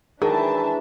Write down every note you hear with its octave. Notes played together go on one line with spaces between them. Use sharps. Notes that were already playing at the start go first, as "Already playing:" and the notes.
D#3 E3 F#3 D4 G#4 E5 A5